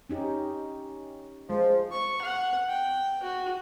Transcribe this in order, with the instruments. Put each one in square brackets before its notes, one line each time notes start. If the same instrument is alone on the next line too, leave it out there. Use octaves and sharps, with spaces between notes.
[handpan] C#4 D#4 G4
[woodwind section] F3 [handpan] G#3
[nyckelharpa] C#6
F#5
G5
F#4